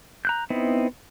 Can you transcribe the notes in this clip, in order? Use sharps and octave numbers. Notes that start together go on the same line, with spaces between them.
A#5 F#6 G6
B3 C4 D#4 E4